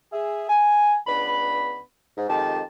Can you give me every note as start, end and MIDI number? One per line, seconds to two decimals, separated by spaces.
0.13 0.46 68
0.13 0.46 76
0.50 0.97 80
1.07 1.80 37
1.07 1.80 59
1.07 1.80 62
1.07 1.80 83
2.17 2.26 44
2.29 2.62 41
2.29 2.62 51
2.29 2.62 56
2.29 2.62 67
2.29 2.62 81